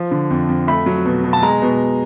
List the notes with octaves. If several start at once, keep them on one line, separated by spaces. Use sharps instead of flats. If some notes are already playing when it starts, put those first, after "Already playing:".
Already playing: F3
D3
F2
F2
A3 B5
F#3
B2
B2
A5
G#3 A#5
B2